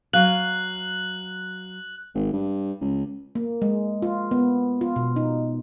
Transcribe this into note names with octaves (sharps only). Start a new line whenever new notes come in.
F#3 F5 F#6 F#7
G#1
G2
C#2
A#3
G#3
F4
B3
F4
B2
D#4